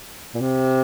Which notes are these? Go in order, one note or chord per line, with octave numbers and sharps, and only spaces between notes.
A#2
C3